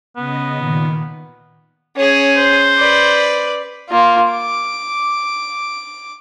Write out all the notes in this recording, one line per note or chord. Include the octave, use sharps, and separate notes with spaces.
C#3 B3 D#5
A#2 D#3
C#4 G#4
C5
B4 D5
A#3 F4
D6